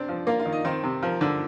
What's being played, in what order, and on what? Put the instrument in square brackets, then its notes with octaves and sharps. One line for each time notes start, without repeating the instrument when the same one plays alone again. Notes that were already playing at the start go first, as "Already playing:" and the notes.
Already playing: [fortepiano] C3 C4 [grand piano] D4 D5
[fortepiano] F3
[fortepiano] A#3 [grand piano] F4 F5
[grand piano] F4 F5
[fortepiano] D#3
[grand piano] D#4 D#5
[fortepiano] D#3 [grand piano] C4 C5
[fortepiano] C3
[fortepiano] F3 [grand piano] A#4
[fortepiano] D3